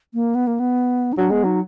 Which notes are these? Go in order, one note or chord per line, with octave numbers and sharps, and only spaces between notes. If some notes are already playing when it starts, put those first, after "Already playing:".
A#3
B3
A#3
B3
D#4
F#3 D4
G#3 B3
F#3 D#4